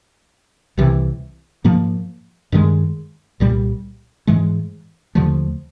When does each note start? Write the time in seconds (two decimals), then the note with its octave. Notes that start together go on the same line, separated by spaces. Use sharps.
0.77 C2 C3 E3
1.64 G#2 F3 A#3
2.52 G2 D#3 G#3
3.40 C2 A#2 G3
4.27 G#2 E3 G#3
5.15 D#2 D3 F3 A3